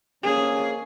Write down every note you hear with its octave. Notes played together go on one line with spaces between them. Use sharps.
F2 A#3 C#4 G#4